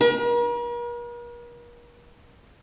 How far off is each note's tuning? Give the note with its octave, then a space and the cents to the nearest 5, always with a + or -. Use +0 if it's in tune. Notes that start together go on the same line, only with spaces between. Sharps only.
A#4 +45